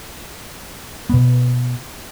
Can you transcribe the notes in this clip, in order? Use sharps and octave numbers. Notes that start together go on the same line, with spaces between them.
B2 B3